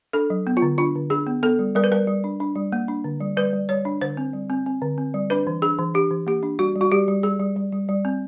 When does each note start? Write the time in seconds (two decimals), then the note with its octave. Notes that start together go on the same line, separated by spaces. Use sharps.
0.13 D4 A4
0.30 F#3
0.47 B3
0.57 F4
0.62 D3
0.78 D4 F4
0.95 D3
1.10 D4 G#4
1.27 B3
1.43 B3 A4
1.59 G3
1.75 G3 A#4
1.84 B4
1.91 G3 A#4
2.07 G3
2.24 D4
2.40 D4
2.55 G3
2.72 A#3
2.88 D4
3.04 D3
3.20 G3
3.37 G3 B4
3.53 G3
3.69 G3 C#5
3.85 D4
4.01 D3 C5
4.17 C4
4.33 G3
4.50 C4
4.66 C4
4.82 D3
4.98 C4
5.14 G3
5.30 D4 B4
5.47 E3
5.62 D4 G#4
5.79 E3
5.94 D4 G4
6.11 E3
6.27 A#3 G4
6.43 D4
6.59 G3 F#4
6.76 G3
6.81 F#4
6.92 G3 G4
7.08 G3
7.23 G3 G#4
7.40 G3
7.56 G3
7.72 G3
7.89 G3
8.05 C4